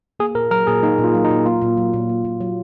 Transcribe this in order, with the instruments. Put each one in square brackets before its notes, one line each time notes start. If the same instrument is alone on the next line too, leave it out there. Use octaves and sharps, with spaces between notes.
[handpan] A#3 [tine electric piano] G#4
[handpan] A#2 [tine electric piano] A#4
[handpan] F#3 [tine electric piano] A#4
[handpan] A#2 [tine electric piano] G#4
[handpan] A#3 [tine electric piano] D#4
[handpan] A#2
[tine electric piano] F4
[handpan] F#3
[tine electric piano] D#4
[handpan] A#2
[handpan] A#3 [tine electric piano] F4
[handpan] A#2
F#3
A#2
A#3
A#2
F#3